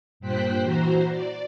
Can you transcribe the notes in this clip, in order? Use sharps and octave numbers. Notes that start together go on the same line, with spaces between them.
G2 A#2 C5 G5 F#6 B6
E3 F#4 C5 A#5
D5